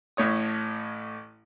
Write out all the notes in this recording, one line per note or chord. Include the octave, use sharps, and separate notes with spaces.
A1 A2 C#5 D#6